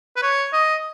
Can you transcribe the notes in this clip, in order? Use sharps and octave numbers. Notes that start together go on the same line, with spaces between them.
B4
C#5
D#5